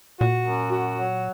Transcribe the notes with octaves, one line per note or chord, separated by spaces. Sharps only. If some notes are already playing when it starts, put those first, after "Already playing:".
A#2 F#4
F#2
F#4
F#3